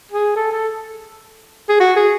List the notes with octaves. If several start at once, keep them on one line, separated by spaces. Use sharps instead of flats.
G#4
A4
A4
G#4
F#4
G#4